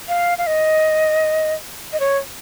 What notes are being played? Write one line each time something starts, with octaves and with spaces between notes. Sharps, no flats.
F5
F5
D#5
D#5
C#5